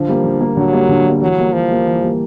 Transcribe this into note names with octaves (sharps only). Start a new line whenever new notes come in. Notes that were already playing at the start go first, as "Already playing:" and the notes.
Already playing: D3 F3
G3 A#3
D3
G3 A#3
D3 F#3
G3 A#3
D3
G3 A#3
E3 F#3
G3 A#3
E3 F3
G3 A#3
E3
G3 A#3